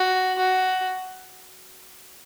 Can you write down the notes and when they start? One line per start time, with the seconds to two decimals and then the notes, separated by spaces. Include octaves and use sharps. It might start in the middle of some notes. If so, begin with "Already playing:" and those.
Already playing: F#4
0.38 F#4